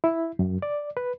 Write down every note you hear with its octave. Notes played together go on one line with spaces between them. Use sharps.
E4
F#2
D5
B4